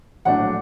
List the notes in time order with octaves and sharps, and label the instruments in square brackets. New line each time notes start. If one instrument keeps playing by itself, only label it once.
[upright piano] A#1 A2 F#3 A3 D4 F#5